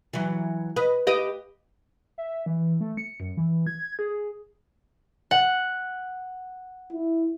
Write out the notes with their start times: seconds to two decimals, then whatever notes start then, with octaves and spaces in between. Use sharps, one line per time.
0.13 E3 F#3
0.76 B4 D#5
1.07 G4 B4 D#5
2.18 E5
2.46 E3
2.81 A3
2.97 C#7
3.20 F#2
3.37 E3
3.67 G#6
3.99 G#4
5.31 F#5
6.92 E4